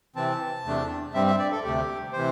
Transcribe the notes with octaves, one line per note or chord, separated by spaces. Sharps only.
C3 E3 C4 A5
E2 C3 A3 D4
G2 G3 C4 E5
E5
D5
A4
D2 C3 A3 G4
C3 E3 C5